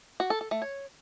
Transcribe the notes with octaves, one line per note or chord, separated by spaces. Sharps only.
F#4
A4
A4
A3
C#5